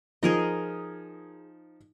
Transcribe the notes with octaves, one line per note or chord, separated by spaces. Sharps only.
F3 D#4 G#4 A#4 D#5